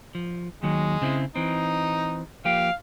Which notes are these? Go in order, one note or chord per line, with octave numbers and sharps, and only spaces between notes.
F3
D#2 D#3 F#3 G#3
C#3 C4 E4
E3 C4 D#4
F3 A#3 G4 F5